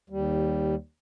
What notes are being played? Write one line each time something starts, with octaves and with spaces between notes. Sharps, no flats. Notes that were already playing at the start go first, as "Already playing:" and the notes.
D#2 G3